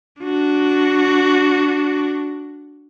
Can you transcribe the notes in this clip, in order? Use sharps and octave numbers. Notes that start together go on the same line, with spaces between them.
D4 F#4